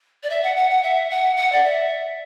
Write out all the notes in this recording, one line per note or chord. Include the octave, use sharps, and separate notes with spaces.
D5
E5
F#5
F#5
F#5
E5
F#5
F#5
D5
E5